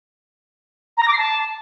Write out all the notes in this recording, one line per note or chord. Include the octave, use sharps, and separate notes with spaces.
A#5
A#6
D6
C7
A5